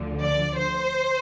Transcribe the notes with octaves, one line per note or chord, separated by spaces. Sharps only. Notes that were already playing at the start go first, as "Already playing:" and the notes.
Already playing: D2 D3 F3
D5
C5